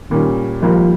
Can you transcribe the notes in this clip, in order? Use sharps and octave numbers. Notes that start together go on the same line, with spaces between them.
A#2 D#3 G3 C#4
G#1 G#2 F3 G3 A#3